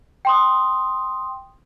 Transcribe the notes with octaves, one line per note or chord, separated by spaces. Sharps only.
G5 C6 D#6